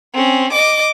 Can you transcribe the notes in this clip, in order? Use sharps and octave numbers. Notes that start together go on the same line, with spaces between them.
C4 C#4
D#5 D6